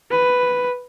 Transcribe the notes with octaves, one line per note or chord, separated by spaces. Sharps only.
B4